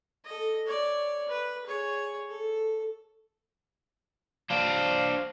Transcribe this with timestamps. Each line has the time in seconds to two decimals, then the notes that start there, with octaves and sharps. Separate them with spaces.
0.25 A4 D#5
0.67 C#5 D5
1.28 B4
1.66 G#4 C#5
2.29 A4
4.50 D4 C5 F5